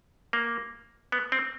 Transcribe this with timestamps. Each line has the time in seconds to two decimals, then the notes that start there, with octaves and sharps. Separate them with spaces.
0.33 A#3
1.12 B3
1.32 C4